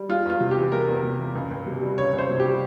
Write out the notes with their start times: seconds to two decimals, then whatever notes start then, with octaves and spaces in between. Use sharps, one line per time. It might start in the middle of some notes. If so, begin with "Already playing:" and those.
Already playing: G3
0.09 G#3 F4
0.26 E2 F4
0.40 C3
0.51 G4
0.57 E3
0.72 G#3 A#4
0.88 E2
1.03 C3
1.19 E3
1.35 C#2
1.51 C#2
1.66 C3
1.81 G3
1.98 C#2 C#5
2.13 C#2
2.18 C5
2.29 C3
2.40 G4
2.45 G3